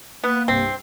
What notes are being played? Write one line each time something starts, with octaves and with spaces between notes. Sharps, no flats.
A#3 B3 B4 F#6
C2 G2 C3 C4 C7